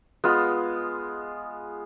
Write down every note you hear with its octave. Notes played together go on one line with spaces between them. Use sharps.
G#3 B3 F4